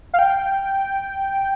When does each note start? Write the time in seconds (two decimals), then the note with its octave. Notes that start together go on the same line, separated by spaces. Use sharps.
0.14 F5
0.19 G5